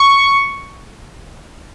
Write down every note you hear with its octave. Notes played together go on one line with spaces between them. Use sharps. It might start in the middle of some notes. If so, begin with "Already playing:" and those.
Already playing: C#6